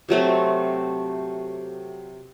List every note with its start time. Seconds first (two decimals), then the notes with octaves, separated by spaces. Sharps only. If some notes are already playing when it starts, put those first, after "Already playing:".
0.09 C3 F#3 A3 C4